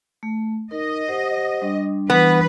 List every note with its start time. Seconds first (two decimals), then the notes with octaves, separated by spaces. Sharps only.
0.23 A3
0.71 D#4 A#4 D#5
1.08 G4 C5 F#5
1.62 G3 D4
2.10 E3 B3 B4